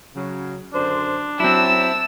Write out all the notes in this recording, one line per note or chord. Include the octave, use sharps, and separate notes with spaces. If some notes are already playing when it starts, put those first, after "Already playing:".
C#3 F#3
F#2 D3 D4 C5
F#3 C4 E4 A5 E6